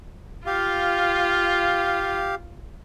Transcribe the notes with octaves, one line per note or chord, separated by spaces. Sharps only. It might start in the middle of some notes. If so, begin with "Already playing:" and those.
F4 G4 F5